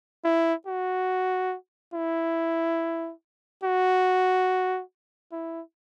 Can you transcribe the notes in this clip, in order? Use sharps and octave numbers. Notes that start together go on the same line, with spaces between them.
E4
F#4
E4
F#4
E4